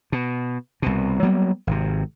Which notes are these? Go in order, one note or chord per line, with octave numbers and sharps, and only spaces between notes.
B2
C2 B2
F#3 G3 A#3 B3
G#1 C3